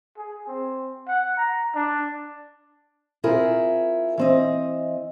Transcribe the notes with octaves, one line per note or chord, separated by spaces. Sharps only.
G#4
C4
F#5
A#5
D4
C4 E4 F4 G#4 A#4
E3 C4 D#5